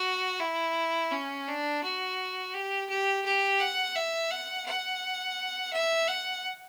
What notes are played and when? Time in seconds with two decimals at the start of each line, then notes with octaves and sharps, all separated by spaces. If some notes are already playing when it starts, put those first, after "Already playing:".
Already playing: F#4
0.41 E4
1.12 C#4
1.48 D4
1.84 F#4
2.54 G4
2.89 G4
3.25 G4
3.60 F#5
3.96 E5
4.31 F#5
4.66 F#5
5.73 E5
6.09 F#5